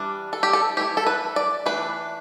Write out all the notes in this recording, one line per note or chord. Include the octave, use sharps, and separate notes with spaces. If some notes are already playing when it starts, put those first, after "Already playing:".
Already playing: E3 G3 D4
A4
G4
A4
E3 A3 E4 G4
A4
B4
D5
E3 A3 D4 B4